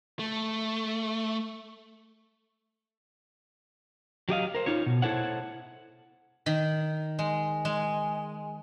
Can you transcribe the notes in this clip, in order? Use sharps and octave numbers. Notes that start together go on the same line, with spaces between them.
A3
F#3 G4 D#5 F5
A#4 C5
D#4 F4 C#5
B2
E4 A4 C5 C#5 F#5
D#3
G#3
G#3